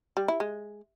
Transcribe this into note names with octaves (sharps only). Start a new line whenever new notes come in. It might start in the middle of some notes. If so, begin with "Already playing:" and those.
G3
E4
G#3